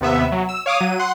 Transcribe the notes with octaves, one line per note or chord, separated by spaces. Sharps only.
D#2 C3 B3 E5
F#3
E6
C#5 F5 D6 D#6
F#3 D#7
F#5 C6